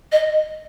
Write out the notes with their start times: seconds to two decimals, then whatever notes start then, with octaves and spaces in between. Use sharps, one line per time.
0.12 D#5